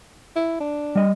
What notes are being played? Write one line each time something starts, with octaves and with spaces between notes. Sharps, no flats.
E4
D4
G3 D#5